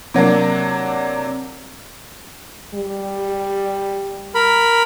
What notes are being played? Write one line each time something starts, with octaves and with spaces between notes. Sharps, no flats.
C3 F#3 A#3 D4
G3
A#4 B5